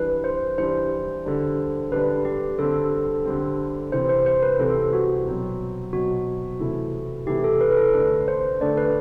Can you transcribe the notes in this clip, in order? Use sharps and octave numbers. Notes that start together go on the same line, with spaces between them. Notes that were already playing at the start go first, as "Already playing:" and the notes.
Already playing: E3 G3 D4 B4
C5
E3 G3 D4 C5
D3 G3 D4
D3 G3 D4 B4
G4
D3 G3 C4 A4
D3 G3 C4
C3 E3 G3 C4 C5
C5
C5
B4
C3 E3 G3 C4 A4
F#4
B2 F#3 C4
B2 F#3 C4 F#4
C3 E3 A3 E4
C3 E3 A3 E4 G4
A4
B4
B4
A4
D3 A3 D4 B4
C5
D3 A3 D4 D5
B4